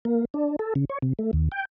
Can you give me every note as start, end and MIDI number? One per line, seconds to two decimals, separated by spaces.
0.05 0.25 58
0.34 0.56 62
0.59 0.74 69
0.75 0.85 49
0.89 0.98 73
1.02 1.13 48
1.19 1.31 57
1.33 1.49 39
1.52 1.65 79